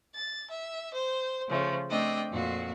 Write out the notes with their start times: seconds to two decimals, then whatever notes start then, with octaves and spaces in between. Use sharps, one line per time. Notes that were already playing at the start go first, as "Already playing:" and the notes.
0.13 A6
0.49 E5
0.93 C5
1.48 C#3 F3 A3
1.88 A3 C4 D4 D#5 G5
2.31 F2 A#2 F#4